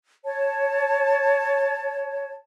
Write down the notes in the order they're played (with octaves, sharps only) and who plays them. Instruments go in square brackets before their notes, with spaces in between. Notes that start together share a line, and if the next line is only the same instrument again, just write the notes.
[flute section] C#5 A5